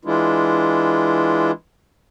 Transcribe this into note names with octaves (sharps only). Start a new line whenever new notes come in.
E3 G#3 D4 E4 F4